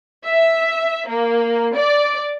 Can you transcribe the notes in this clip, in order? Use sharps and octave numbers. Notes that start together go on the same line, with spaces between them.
E5
A#3
D5